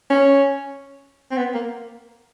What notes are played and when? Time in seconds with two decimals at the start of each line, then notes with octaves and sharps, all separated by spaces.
0.10 C#4
1.31 C4
1.38 B3
1.54 A#3